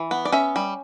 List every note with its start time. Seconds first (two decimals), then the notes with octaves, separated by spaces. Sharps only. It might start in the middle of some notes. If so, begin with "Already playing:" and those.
Already playing: E3
0.11 B3
0.25 D5
0.32 C#4 E5
0.56 G3